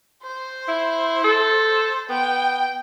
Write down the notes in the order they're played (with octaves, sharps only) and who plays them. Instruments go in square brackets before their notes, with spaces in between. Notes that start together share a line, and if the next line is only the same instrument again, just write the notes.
[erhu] C5
[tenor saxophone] E4
A4
[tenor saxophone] B3 [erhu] G5